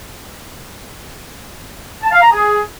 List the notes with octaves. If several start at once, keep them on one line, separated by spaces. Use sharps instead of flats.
A5
F5
A#5
G#4